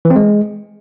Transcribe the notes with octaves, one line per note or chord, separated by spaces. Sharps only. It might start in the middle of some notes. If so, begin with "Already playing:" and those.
E3
C4
G#3